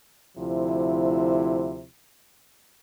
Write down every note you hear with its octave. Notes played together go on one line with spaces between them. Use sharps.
D2 C3 F3 E4